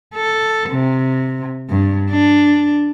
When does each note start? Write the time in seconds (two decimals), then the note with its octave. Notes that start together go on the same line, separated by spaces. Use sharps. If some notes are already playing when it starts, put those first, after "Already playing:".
0.15 A4
0.70 C3
1.69 G2
2.10 D4